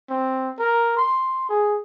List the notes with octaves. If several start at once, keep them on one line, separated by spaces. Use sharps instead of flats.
C4
A#4
C6
G#4